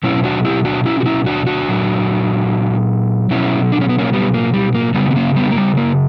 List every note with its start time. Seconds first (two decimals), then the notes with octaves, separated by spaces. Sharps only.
0.03 B2 F#3 C#4 E4
0.24 D4 F#4
0.45 E4 G4
0.65 D4 F#4
0.86 C#4 E4
1.00 F#4
1.06 C#4 E4
1.26 D4 F#4
1.47 D4 F#4
1.68 A#2 F#3
3.31 B2 F#3 C#4 E4
3.72 D4
3.81 C#4
3.89 B3
3.99 A#3 C#4
4.13 G3 B3
4.34 A#3
4.54 G3
4.75 A#3
4.94 C#3 F#3 G3 B3
5.11 B3
5.16 A#3 C#4
5.36 G3 B3
5.51 A#3
5.57 G3
5.77 A#3